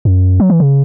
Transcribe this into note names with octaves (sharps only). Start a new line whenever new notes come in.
F#2
F#3
E3
C#3